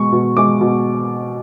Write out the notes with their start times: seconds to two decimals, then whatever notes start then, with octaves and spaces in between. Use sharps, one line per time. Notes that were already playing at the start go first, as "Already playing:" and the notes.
Already playing: B2 G#3 C#6
0.12 B2
0.37 G#3 D6
0.61 B2